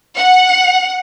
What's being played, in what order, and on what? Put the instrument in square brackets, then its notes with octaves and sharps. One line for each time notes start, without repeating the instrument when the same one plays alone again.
[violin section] F#5